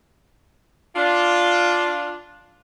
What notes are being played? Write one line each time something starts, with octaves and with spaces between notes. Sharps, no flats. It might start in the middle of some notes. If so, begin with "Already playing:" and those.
D4 F4